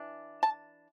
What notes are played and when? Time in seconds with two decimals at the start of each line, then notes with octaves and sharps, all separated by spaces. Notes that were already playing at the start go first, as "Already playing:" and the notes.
Already playing: E3 D4
0.43 A5